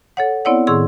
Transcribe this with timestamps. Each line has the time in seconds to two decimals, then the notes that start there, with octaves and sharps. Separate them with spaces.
0.17 A4 C#5 F#5
0.45 B3 C4 E4 C#5 D5 F#5
0.67 A2 D#3 G#4 C6 E6